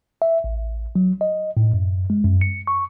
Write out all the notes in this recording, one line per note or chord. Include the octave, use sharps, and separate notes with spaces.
E5
A1
F#3
D#5
A2
F#2
G#3
F#2
C#7
C#6